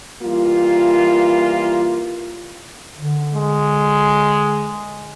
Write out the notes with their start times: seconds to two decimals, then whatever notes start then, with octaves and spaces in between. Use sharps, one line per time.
0.22 E3 G3 A#3 F4
2.97 D3
3.34 G#3